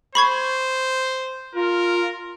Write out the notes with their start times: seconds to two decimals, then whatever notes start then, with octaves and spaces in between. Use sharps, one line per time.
0.15 C5 B5 C#6 G#6
1.55 F4 A#4